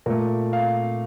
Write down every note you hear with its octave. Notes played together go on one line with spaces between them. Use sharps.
A#2 A3 A#4
F5